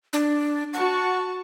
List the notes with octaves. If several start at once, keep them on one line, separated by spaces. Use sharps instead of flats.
D4
F#4 F#5 A5 C#6